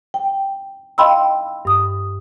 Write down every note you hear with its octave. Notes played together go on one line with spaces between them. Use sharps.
G5
D#5 F5 G5 B5 C6 E6
G2 D#6